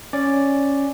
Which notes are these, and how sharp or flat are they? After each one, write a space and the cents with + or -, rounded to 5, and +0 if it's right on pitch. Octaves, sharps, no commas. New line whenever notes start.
C#4 +0 D5 +0